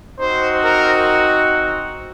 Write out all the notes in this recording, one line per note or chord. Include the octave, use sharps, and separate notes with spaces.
C4 D#4 F#4 C5
A#4